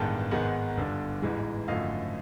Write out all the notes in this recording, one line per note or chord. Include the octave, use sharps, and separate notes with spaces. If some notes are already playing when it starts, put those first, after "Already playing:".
Already playing: A1 G2 D#3 G#3 B3 G5 A5
G#1 G#2 D#3 G#3 B3 F#5 G#5
G1 G2 D3
A1 G#2 E3 G#3
G#1 F#2 D3 F3 A3 D#5 F5